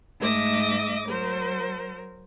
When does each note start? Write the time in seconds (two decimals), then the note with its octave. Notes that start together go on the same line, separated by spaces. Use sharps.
0.19 G#2 A3 D#5 E5 D6 A#6
1.07 F#3 A#4 C5